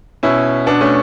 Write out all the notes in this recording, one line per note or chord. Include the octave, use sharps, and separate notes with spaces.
B2 C#4 E4
B2 B3 D4
A3 C#4